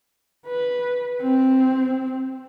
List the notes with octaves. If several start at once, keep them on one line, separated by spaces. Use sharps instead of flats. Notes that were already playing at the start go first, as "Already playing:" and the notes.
B4
C4